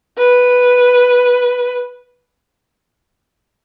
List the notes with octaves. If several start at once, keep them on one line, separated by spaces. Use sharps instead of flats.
B4